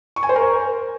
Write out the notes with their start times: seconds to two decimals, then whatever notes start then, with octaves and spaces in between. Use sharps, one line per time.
0.16 C#6
0.23 G#5
0.29 C5
0.36 A#4